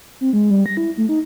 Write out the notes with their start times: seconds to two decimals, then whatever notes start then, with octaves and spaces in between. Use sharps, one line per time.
0.21 C4
0.33 G#3
0.50 G3
0.66 A#6
0.77 E4
0.97 A3
1.09 D#4